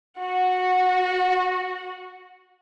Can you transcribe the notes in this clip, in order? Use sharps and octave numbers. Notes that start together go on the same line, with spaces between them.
F#4 F#5